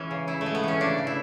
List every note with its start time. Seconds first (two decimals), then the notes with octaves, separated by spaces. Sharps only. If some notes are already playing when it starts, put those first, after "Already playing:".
Already playing: E3 G#3 C#4
0.11 C#3
0.27 C#3 E4
0.41 A3
0.46 G#3
0.55 B3
0.63 E3 C#4
0.80 C#3 D4
0.98 C#3
1.07 E4